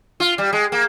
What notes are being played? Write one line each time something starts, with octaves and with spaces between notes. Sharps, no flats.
F4
G3
G#3
A#3